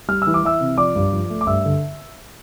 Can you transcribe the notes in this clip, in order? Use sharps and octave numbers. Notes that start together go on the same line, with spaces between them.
G3 F6
E6
E3
D6
E3 E5 E6
C3
F3 D5 D6
G2
F3
A3
D6
G2 E5 E6
D3